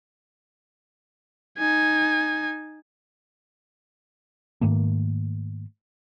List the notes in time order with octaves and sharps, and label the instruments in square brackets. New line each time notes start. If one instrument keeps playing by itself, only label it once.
[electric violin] D#4 G#5
[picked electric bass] G#2 D#3 A3 A#3